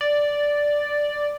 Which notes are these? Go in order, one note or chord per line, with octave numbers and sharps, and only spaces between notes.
D5